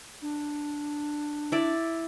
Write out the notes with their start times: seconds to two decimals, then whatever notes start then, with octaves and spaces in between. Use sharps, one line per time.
0.22 D4
1.52 E4 D5